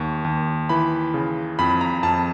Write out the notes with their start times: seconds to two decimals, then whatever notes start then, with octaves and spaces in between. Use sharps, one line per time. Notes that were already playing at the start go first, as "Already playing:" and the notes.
Already playing: D#2 C#6
0.25 D#2
0.69 E3 B5
1.14 C#3
1.59 F2 B5
1.81 A#5
2.03 F2 A5